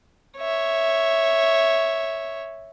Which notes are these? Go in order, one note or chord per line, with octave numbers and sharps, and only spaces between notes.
C#5 E5